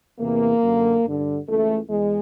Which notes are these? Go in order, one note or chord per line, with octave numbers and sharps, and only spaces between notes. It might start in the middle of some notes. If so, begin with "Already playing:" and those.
E2 C3 E3 A#3
F#2 D3
G2 D3
C#2 C#3 E3 A3
E2 G#3